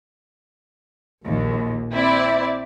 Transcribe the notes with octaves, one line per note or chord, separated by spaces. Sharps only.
A#1 D#2
C4 E4 D5